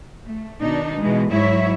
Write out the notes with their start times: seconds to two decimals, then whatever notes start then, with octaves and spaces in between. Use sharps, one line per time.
0.24 A3
0.61 B2 D#3 D4 D#4
0.99 B2 E3 G#3
1.31 G#2 F#3 E4 C#5 E5